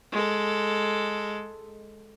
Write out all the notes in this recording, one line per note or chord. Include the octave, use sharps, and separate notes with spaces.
G#3 A4